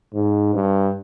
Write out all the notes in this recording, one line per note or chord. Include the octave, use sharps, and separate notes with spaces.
G#2
G2